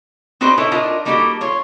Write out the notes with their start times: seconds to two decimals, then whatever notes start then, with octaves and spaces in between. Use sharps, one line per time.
0.41 C4 D#4 F#4 B4 C5 D5
0.57 D#4 E4 A4 B4 C#5
0.72 D4 D#4 F4 A#4 D#5
1.05 G3 A#3 D#4 F#4 G4 A4
1.41 F4 C#5